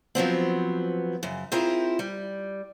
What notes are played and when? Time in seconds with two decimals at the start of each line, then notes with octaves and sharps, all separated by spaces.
0.15 F3 F#3 B3 C4
1.23 F#2 C#3
1.52 C4 E4 F4 G#4 A#4
1.99 G3